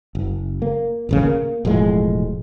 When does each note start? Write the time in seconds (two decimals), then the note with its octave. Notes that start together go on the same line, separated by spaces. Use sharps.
0.15 F#1
0.62 A#3
1.09 D#1 A1 C#3
1.23 A#3
1.65 E1 A2 F3 G#3